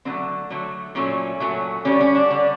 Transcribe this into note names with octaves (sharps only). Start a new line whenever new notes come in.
D3 F#3 A3 C4
D3 F#3 A3
A#2 F#3 A3 C#4
A#2 F#3 A3
D3 G3 C#4
C#4
D4
D3 G3